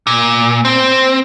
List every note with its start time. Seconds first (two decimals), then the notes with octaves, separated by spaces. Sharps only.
0.07 A#2
0.65 C4